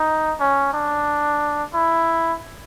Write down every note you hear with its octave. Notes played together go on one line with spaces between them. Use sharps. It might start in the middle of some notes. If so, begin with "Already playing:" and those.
Already playing: D#4
C#4
D4
E4